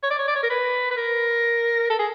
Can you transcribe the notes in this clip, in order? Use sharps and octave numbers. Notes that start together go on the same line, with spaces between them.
C#5
D5
C#5
D5
C#5
A#4
B4
B4
A#4
A4
G#4